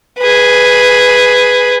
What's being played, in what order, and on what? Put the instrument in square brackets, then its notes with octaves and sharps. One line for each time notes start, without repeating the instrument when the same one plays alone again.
[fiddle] G#4 B4